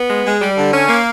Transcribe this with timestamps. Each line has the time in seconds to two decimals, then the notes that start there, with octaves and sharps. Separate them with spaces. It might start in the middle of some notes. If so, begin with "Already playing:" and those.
Already playing: B3
0.09 G#3
0.25 G#3
0.41 G3
0.57 D3
0.73 C#4
0.89 A#3